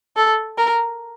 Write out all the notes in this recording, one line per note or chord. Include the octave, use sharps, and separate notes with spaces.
A4
A#4